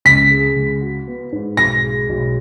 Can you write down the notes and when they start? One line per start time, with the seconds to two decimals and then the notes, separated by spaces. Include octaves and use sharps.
0.05 C#2 B6
0.31 G#3
0.56 C#2
0.81 F#4
1.07 B3
1.32 G#2
1.57 B1 A#6
1.84 G#3
2.09 B1